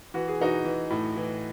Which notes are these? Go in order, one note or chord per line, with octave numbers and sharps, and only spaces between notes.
E3 F#4
G#4
E3 D#4 F#4
E3
A2
E3